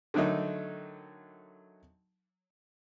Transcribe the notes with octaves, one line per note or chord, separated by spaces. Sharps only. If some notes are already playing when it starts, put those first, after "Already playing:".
D3 D#3 F#3 A3 D#4